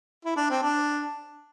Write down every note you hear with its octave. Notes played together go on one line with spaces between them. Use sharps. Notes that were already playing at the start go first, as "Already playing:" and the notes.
E4
D4
C4
D4